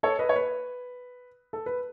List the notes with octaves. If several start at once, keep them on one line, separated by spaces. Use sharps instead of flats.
A4 C#5
B4 D#5
C#5
B4
A4
B4